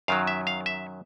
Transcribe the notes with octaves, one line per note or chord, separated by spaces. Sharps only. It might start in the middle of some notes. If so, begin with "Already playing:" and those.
F#2 D#3 F#3 F5
E5
F5
E5